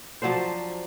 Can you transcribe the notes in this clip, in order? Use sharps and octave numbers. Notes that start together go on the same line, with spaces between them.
F3 F#3 D4 C5